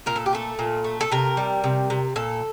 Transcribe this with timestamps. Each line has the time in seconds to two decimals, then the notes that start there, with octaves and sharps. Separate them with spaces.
0.06 A#2 A#4
0.16 A4
0.26 G4
0.33 A3 A4
0.59 A#2
0.84 A3
1.01 A4
1.11 C3 A#4
1.37 G3
1.64 C3
1.90 C3
2.16 A#2 A4